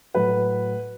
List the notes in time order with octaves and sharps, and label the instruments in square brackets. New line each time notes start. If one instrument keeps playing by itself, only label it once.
[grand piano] A2 F#3 A3 B4